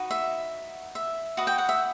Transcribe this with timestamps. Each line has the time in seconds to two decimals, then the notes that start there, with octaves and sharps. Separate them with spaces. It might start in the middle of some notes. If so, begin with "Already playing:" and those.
Already playing: D#4 F#4 B4
0.11 E5
0.95 E5
1.37 F#4 B4 D#5
1.47 G5
1.58 F#5
1.69 E5